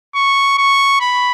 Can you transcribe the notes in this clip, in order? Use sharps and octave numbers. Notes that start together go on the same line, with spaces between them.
C#6
C#6
B5